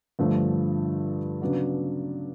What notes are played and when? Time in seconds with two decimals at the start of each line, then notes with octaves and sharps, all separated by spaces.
0.19 G2 D3 F3 A3
1.42 C#3 F#3 B3 D4 F#4